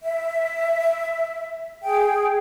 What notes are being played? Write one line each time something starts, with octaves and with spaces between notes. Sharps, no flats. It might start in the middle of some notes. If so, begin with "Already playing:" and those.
E5
G#4 G5